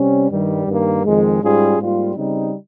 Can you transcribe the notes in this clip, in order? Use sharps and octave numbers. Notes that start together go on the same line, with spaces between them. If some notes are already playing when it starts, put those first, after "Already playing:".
Already playing: C3 G3 C#4
G2 D#3 G3
G2 D#3 A#3
F2 D#3 G#3
G#2 G3 C#4 F4 G#4
G#2 G3 A#3 F4
C#3 G3 C4 D#4